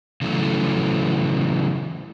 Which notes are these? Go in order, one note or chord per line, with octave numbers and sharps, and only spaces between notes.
C#3 E3 F#3 A3